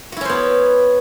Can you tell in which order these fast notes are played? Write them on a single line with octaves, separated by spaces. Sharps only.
F#4 E4 C#4 C5 B3